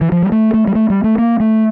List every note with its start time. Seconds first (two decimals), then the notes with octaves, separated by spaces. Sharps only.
0.01 E3
0.12 F3
0.22 G3
0.32 A3
0.54 A3
0.67 G3
0.75 A3
0.90 G3
1.04 A3
1.18 A#3
1.40 A3